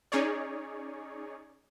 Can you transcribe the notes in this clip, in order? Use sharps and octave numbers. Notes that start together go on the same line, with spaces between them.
C#4 D#4 G#4 C#5 D5